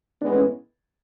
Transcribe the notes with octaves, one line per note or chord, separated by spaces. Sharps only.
A2 E3 G#3 B3 D4
C#4